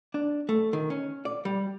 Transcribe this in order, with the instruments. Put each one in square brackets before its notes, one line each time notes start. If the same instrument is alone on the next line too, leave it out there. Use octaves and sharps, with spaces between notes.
[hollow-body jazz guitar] D4
A3
D#3
C#4
D5
G3